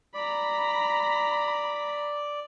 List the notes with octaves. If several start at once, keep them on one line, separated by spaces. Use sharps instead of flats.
D5 A#5 B5